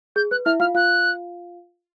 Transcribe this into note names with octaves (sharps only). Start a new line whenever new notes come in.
G#4 G6
B4 F#6
E4 E5 F6
F4 F5 F6
F4 F5 F#6